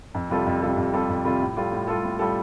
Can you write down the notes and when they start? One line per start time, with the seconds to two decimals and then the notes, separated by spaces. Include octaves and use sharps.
0.15 F2
0.30 C3 G3 F4 A4
0.47 F2
0.62 C3 G3 F4 A4
0.77 F2
0.93 C3 G3 F4 A4
1.09 F2
1.25 C3 G3 F4 A4
1.41 A2
1.57 G3 F4 A4
1.72 A2
1.87 G3 F4 A4
2.04 A2
2.19 G3 F4 A4